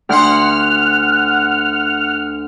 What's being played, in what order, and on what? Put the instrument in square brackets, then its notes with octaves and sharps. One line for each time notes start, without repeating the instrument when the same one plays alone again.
[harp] D2 C6 [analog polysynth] F#5 F6